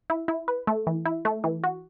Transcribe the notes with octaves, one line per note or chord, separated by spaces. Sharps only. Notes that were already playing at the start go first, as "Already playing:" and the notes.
E4
E4
B4
A3
E3
E4
A3
E3
F#4